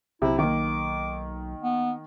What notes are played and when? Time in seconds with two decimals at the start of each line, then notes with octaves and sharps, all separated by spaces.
0.22 B1 C3 E4
0.39 D#3 A#3 D6
1.63 B3